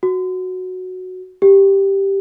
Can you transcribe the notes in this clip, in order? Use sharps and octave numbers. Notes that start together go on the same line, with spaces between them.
F#4
G4